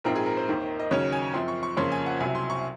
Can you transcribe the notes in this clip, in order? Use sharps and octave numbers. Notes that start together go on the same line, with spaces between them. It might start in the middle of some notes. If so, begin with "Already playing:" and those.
A#1 G#2 F3 C4 A#4
G#4
A#4
C5
D#2 D#3 A#3
D#5
D#2 C#3 F#3 C#4 C#5
G#5
F#2 F3 C4 C6
C#6
C#6
F2 C#3 F3 A#3 C#4 C6
G#5
F#5
C2 C3 F#3 G#5
C6
C#6